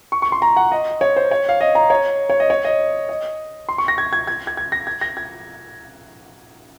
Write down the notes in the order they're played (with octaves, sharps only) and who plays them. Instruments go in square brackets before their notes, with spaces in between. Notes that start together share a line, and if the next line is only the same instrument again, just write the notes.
[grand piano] C#6
C#6
C6
A#5
F#5
D#5
C#5
C5
C#5
F5
D#5
A#5
C#5
C#5
D#5
C#5
D#5
D#5
C6
C#6
A#6
G#6
G#6
G#6
G#6
G#6
A#6
G#6
A#6
G#6